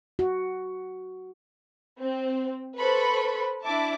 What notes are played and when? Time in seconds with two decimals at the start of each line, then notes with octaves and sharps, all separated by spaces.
0.19 F#4
2.00 C4
2.78 A4 B4 C5 B5 C#6
3.63 D4 E4 E5 A5 D6